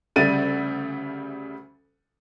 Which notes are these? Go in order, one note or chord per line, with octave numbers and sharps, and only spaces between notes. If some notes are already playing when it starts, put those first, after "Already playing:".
D2 C#3 G3 E5 A6 D#7